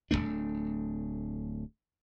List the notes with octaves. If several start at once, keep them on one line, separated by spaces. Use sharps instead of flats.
D1 G#2 A3 D4